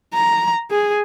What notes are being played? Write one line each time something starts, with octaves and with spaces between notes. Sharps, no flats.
A#5
G#4